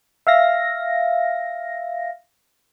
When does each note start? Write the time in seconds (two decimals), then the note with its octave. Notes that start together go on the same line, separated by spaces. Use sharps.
0.27 E5 F5 A#6